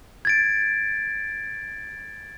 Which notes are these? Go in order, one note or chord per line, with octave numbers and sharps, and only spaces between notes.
G#6 A6 D7